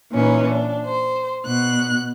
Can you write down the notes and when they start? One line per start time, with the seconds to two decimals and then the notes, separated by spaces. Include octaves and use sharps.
0.11 A#2 E3 C#4 D#4
0.49 D4
0.85 C5
1.46 B2 F#6